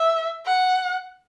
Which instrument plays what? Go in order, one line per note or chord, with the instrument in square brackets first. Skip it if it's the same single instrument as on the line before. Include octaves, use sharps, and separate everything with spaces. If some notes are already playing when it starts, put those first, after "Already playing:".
Already playing: [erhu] E5
F#5